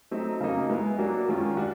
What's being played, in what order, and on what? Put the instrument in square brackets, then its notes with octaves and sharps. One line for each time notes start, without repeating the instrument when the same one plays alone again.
[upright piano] F#3 A3 C4 D#4
C#3 F#3 A#3 D#4
G#3 B3 E4
F#3 A#3 D4 F#4
D#3 G#3 C#4 F4
D4 F#4